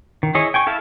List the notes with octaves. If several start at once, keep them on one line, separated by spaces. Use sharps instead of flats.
D#3
E4 G#4 C#5 D#5 E5
G5 G#5 C#6
E4 A4 F5 A5